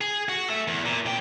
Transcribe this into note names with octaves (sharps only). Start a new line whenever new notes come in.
G#4
F#4
A4 E5
E2
A#2
F2 G5